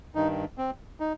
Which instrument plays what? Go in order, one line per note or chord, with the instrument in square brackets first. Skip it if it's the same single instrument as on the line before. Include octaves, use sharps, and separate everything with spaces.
[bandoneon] G2 D#3 D#4
C4
D#4